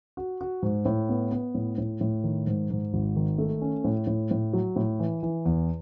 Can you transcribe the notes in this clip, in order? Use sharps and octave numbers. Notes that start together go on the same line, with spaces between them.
F#4
F#4
G#2
A2
B3
B3
A2
A2
A2
D#3
G#2
G#2
G#1
D#3
A3
C#4
A2
A2
A2
F#3
A2
E3
E3
E2